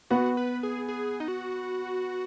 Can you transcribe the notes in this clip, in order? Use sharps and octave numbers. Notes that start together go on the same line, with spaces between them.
B3 F#4
B4
G#4
G#4
D#4
F#4